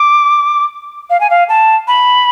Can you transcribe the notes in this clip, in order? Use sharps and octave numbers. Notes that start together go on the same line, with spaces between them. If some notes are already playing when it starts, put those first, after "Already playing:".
Already playing: D6
F5
G#5
F5
A5
B5